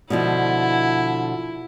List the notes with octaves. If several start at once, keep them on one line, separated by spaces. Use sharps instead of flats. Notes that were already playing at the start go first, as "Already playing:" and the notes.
B2 D3 F3 E4